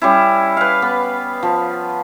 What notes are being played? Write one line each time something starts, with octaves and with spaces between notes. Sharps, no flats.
G3 C#4 E4
B4 F5
B3
F3